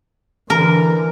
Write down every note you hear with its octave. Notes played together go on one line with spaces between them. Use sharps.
D3 E3 A#4